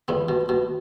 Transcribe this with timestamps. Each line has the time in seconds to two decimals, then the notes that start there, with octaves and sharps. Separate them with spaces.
0.08 E2 B3
0.29 B2
0.49 B2